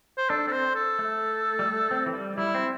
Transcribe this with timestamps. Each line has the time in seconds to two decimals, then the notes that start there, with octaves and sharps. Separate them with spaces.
0.18 C5
0.30 D4 A4
0.47 C4 A4
0.52 C5
0.75 A4
0.99 A3
1.59 G3
1.68 A3
1.91 C4
2.06 E3
2.14 G3
2.37 G3 E4
2.54 C4